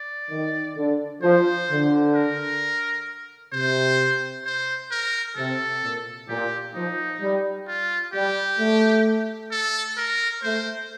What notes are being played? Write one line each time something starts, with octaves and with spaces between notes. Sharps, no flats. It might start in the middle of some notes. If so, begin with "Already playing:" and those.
Already playing: D5
D#3
D3
F3 C5
D3
A#4
C3 C5
C5
A#4
C3 A4
A#2
A#2 G4
F3 D#4
G3
F4
G3 G4
A3
A4
A#4
A3 C5